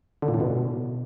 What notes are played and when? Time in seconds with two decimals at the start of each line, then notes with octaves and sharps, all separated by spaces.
0.22 D3
0.28 A#2
0.34 A2
0.40 B2